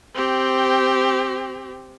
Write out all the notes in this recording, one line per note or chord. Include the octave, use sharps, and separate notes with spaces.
C4 G4